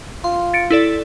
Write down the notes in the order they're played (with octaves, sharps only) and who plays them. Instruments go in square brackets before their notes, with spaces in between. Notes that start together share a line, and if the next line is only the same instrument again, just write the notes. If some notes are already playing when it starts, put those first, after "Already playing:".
[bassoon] F4 [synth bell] C6
[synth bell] A6 C#7 D7
E4 A4 D5